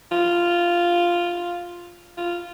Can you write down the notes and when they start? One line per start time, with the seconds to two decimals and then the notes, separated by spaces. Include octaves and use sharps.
0.12 F4
2.17 F4